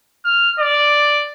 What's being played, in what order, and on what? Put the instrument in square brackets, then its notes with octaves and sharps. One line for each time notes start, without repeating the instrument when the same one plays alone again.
[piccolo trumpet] F6
D5